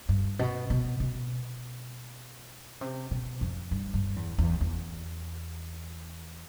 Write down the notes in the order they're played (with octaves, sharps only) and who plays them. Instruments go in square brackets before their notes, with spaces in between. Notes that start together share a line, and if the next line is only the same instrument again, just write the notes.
[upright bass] G2
B2
B2
B2
C3
B2
F2
G2
G2
E2
E2
E2